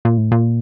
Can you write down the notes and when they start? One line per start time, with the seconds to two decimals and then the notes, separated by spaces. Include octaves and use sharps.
0.05 A#2
0.18 A2
0.32 A#2